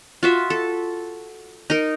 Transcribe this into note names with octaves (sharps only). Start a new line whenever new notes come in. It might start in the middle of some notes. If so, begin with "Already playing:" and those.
F4 F#4 E5
A4
D#4 A#4